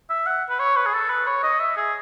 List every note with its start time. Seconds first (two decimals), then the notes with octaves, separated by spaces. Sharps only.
0.09 E5
0.26 F#5
0.50 B4
0.59 C#5
0.76 B4
0.86 G#4
0.93 A4
1.10 B4
1.26 C#5
1.43 D#5
1.60 E5
1.77 G#4